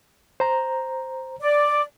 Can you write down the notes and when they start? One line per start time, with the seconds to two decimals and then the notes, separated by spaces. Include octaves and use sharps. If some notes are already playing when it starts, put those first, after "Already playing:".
0.40 C5 A#5
1.40 D5